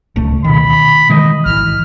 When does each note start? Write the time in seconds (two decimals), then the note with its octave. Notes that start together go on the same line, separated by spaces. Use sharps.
0.16 D1 C#2 A3
0.44 B2 D#3 B5
1.10 D#3 E3 G#3 D#5
1.46 G#1 E3 F6